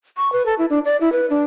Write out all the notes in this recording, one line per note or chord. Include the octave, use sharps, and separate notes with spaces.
C#6
B4
A4
E4
D4
D5
E4
B4
D4